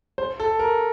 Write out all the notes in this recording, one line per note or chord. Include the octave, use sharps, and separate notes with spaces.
C5
A4
A#4